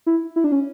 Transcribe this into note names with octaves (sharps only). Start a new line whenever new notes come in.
E4
E4
D4
C#4